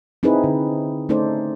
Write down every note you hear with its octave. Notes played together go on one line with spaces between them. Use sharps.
C4 D#4 E4 G#4 B4
D3
A3 C#4 D#4 A4 C5 D5